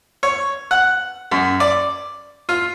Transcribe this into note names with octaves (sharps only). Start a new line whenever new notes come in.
C#5
F#5
F#2
D5
F4